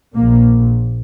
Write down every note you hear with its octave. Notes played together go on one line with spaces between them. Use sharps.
A#1 A#2 A#3